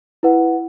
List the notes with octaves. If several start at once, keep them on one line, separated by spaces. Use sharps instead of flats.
E4 B4 F#5